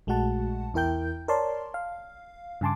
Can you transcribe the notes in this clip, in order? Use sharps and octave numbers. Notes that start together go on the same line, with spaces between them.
A#1 G#3 A3 F#4 F#5 A5
E2 E4 A#4 G5 G6
A#4 C#5 D5 A5 C6
F5
G2 C#3 G#5 A5 C6 D6